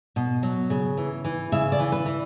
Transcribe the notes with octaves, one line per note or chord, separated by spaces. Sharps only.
B2
F#3
C#3
E3
E3
C#3 E5
D5
E3
B4
E3